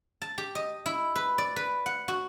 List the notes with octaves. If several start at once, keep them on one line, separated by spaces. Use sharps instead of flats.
A5
G4
D#5
E4
B4
D5
B4
F#5
F#4